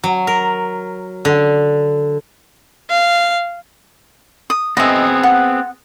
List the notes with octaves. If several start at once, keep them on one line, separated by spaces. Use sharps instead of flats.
F#3
A#4
D3
F5
D#6
B3 C4 G#4 D#5 E5
F#5